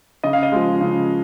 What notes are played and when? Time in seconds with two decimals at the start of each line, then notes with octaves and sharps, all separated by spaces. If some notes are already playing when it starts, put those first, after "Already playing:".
0.23 C#3 D#5
0.33 F5
0.43 D#5
0.52 F3 G#3
0.81 C#3